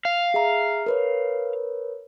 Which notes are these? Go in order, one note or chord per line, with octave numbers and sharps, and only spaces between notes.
F5
G#4 E5 A#5
A#4 B4 C#5